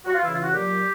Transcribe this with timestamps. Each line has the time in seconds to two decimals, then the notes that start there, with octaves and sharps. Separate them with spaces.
0.05 F#4
0.14 F4
0.23 C#3 E3 E4
0.33 F4
0.43 F#4
0.53 A#2 F#3 G4